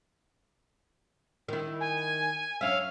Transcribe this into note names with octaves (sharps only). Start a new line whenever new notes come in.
D#3 E4
G#5
F#2 C#4 E5 F5